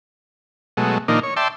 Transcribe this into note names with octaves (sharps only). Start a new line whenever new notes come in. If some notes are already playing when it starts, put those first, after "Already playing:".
B2 F#3 G#3 A3
A#2 D#3 F3 A#3 D4 D#4
C#5
D5 E5 G5 A5 C6